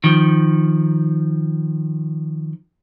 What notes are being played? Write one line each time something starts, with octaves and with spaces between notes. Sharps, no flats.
D#3 F3